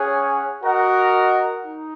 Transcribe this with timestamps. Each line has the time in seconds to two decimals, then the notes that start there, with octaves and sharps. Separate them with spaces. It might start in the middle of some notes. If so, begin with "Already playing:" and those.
Already playing: C#4 G#4 C#5 F#5
0.62 F#4 A#4 D#5 F#5
1.64 D#4